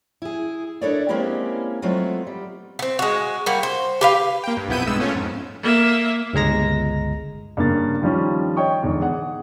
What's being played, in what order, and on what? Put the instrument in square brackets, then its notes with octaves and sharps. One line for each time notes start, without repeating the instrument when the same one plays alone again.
[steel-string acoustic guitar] E4 G#4
D4 E4 A4 A#4 C#5 D5
G#3 A#3 C4 C#4 E4 G4
F#3 G#3 A3 B3 C4 F4
G3
[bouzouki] B3 C4
G#3 F#4
G3 A#3 F#4
C5
G4 B4 F5
[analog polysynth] A#3 G5
G2
B1 F2 B3 E4 G6 D#7
G2 G#3 B3 E6
A3 C#4 F4
F2 G#2
[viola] A#3 E5
[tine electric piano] G1 C#2 G#3 A#5 A#6
[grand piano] G2 C#3 A#3 A6
D#3 F3 G3 C#4
C#5 D#5 G5 C#6 D#6
E2 G#2 D3
G#4 F#5